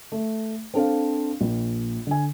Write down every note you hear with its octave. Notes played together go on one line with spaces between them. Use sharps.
A3
C4 D4 A4 C5 F5
A#1
D3 G#5